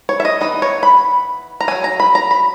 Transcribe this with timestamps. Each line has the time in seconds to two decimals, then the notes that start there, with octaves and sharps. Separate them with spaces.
0.09 C#5
0.20 E5
0.25 D#5
0.41 E3 B3 D#4 D#5
0.62 C#5
0.83 B5
1.61 A#5
1.68 C#4 G#5
1.71 F#3
1.84 A#5
2.00 B5
2.15 A#5
2.31 B5